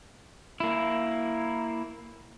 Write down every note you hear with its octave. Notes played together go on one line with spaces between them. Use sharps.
A#3 E4